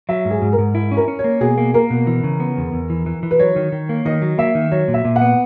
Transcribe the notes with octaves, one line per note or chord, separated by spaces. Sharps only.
F#3 E5
G#2
G#4
G#2
A#4
G#2
E4
C#4
A#4
C#4
C#5
A#3
B2 G#4
A#3
A#3 A#4
B2
E3
C#3
B3
E2
E2
E3
E3
E3
B4
F#3 C#5
D#3
D#3
A#3
D#3 D#5
F#3
A#3 E5
D#3
F#3 C#5
A#2
E5
A#2
F#5
B3